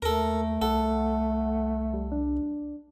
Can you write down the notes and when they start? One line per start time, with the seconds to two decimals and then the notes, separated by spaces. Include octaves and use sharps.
0.02 D#2 A3 A4 A#4
0.62 C2 A4 F#5
1.94 G3
2.12 D4